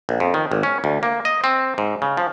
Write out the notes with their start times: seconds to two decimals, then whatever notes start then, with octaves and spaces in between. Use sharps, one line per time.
0.09 A#1
0.20 F2
0.34 D#3
0.51 G#1
0.63 C#4
0.84 D2
1.03 A#3
1.25 D#5
1.44 C4
1.78 G#2
2.02 C#3
2.17 F3